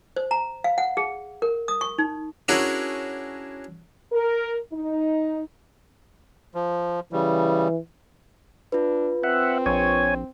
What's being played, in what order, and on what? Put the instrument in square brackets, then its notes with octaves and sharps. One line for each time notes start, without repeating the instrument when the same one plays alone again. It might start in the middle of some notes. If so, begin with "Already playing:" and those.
[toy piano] C5
A#5
F5
F#5
G#4
A#4
D#6
C#6
D#4
[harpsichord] C#4 D4 E4 F#4 G#4 A#4
[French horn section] A#4
D#4
[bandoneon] F3
[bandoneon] C#3 G3 [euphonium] E3
[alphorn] D4 [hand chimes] F4 B4
[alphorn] C4 [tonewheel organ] E5 F#5
[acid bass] A#1 [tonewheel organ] C#5 G#5